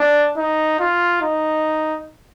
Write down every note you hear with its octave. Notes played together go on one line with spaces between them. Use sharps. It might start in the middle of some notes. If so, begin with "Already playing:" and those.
Already playing: D4
D#4
F4
D#4